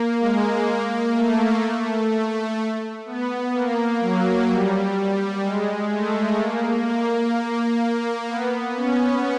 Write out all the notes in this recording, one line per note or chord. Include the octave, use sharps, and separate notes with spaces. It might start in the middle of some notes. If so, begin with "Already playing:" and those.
Already playing: A#3
G#3
A#3
A3
B3
A#3
F#3
G3
G#3
A3
A#3
A#3
B3
C#4